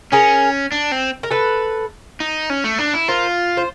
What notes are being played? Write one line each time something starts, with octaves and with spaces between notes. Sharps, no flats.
C#4 G#4 A#4
D4
C4
A#4
A4 B4
D#4
C#4
A3
D4
E4
F4 A#4 C5
C5